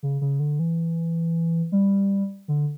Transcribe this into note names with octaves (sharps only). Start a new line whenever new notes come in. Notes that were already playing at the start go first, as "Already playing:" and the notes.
C#3
C#3
D3
E3
G3
D3